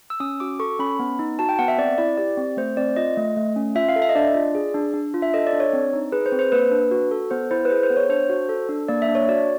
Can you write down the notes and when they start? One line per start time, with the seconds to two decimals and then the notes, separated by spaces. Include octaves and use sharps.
0.10 E6
0.20 C#4 D#6
0.40 F#4 D6
0.59 A4 C#6
0.79 C#4 B5
0.99 B3
1.19 D#4
1.39 F#4 A5
1.49 G5
1.59 B3 F#5
1.68 E5
1.78 C4 D5
1.98 E4 D5
2.18 G4 D5
2.37 C4
2.57 A3 C5
2.77 C4 D5
2.96 F4 D#5
3.17 A3
3.36 A3
3.56 C#4
3.75 F4 E5
3.89 F5
3.96 A4
4.02 E5
4.09 D#5
4.15 D4 D5
4.35 F4
4.55 G#4
4.74 D4
4.94 D4
5.14 F4
5.22 E5
5.34 A4 D#5
5.47 D5
5.53 D4
5.60 C#5
5.73 C4
5.93 D#4
6.12 G#4 B4
6.26 C5
6.32 C4
6.39 C5
6.52 A#3 B4
6.71 D4
6.91 F#4
7.11 A4
7.31 B3 C5
7.51 E4 C5
7.65 B4
7.70 G#4 C5
7.83 C5
7.90 B3
7.97 C#5
8.09 D4 C5
8.30 F#4
8.49 A4
8.69 D4
8.88 A#3 D5
9.02 E5
9.08 D4
9.15 C#5
9.29 F#4 D5